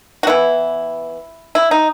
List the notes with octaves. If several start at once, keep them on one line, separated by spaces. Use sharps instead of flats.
F#4
E3 B3 E4
E4
D#4